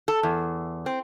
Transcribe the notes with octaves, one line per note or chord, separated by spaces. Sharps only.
A4
E2
C4